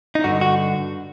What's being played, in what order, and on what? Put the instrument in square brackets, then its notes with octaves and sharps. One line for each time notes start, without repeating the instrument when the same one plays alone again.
[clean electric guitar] D#4
G2 D3 F#4
F#4